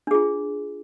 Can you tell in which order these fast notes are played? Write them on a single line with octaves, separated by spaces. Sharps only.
D4 G#4 F4